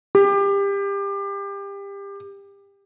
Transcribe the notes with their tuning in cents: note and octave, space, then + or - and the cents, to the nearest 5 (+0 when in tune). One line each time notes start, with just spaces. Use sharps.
G4 +25